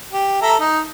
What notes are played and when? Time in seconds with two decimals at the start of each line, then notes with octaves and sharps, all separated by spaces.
0.13 G4
0.42 A4 E5 A#5
0.60 D#4